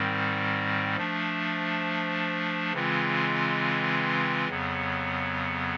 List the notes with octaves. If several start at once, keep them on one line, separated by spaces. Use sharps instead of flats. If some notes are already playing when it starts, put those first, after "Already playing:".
Already playing: G#2 D#3 G3 C4
F3 A3 D4
C#3 E3 G#3 C4 F4
F2 C#3 F#3 B3